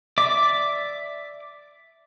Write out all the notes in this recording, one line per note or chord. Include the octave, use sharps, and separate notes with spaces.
D5 E5 D6